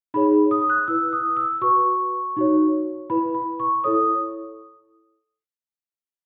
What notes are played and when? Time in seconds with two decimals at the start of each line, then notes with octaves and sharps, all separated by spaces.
0.14 D#4 G#4 C#5 B5
0.51 D#6
0.70 F#6
0.88 E4 B4 E6
1.13 D#6
1.37 E6
1.62 F#4 B4 C#6
2.37 D#4 F#4 C#5
3.10 E4 B4 B5
3.34 B5
3.60 C#6
3.84 E4 A4 C#5 D#6